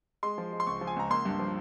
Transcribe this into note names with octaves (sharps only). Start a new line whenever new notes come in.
G#3 C6
F3
G#3
C6
C#2 C#6
F3
G#5
C#2 A#5
A#3 C6
G2
F3